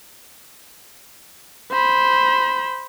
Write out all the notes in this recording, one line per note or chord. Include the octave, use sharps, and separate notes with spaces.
C5 B5